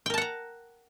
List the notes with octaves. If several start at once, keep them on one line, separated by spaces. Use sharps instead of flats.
A#4 F#5 G5 A5 A#5